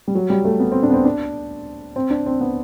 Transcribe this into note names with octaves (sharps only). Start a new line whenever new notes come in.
G3
F#3
G3
A3
B3
C4
D4
B3
C4
D4
C4
D4
C4
B3